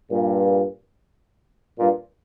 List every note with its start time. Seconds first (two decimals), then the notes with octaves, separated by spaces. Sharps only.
0.11 G2 A#2
1.79 G2 A#2